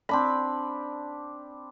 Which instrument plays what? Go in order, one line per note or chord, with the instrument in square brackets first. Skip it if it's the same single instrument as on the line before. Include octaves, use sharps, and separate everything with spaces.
[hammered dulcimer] C4 D4 B5